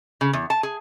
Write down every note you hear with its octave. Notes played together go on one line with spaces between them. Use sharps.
C#3
E2
A5
G#4